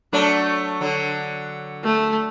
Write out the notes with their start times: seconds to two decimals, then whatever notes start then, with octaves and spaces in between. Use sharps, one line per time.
0.13 F#3 A3 D4
0.81 D3 F#3
1.83 A3